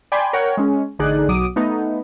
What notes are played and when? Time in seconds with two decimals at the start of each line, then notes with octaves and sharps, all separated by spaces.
0.12 D5 G5 G#5 B5 C6 D6
0.33 A#4 C#5 F#5 G5
0.57 G#3 C#4
0.99 A1 D3 D#4 G#4 D5 F#6
1.28 B1 F#3 D6 D#6 D7 D#7
1.56 A3 B3 D#4